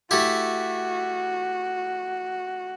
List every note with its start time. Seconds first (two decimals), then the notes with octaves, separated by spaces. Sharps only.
0.11 A3 E4 F#4 G4